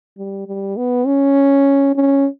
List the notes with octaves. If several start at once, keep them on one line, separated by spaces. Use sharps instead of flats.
G3
G3
B3
C#4
C#4